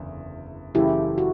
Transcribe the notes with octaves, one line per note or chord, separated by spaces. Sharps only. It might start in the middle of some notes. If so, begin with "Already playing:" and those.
Already playing: F#1 E2 D3
F#1 F#2 C#3 E3 A3 E4 G4
F#4